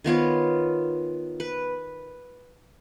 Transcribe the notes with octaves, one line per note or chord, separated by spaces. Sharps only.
D#3 B3 F4 C#5
B4